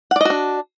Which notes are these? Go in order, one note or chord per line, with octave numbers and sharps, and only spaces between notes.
D4 F#4 D5 D#5 F#5